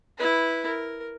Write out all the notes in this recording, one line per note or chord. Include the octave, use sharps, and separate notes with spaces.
E4 B4
A#4